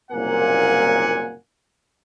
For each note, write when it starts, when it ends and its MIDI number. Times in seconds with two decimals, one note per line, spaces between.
0.11 1.32 30
0.11 1.32 36
0.11 1.32 46
0.11 1.32 58
0.11 1.32 78
0.11 1.32 80